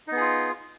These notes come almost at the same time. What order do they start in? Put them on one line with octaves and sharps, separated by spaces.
D#4 B3 G#4 F4